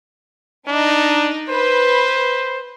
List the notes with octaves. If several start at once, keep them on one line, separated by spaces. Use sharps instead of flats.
D4 D#4
B4 C5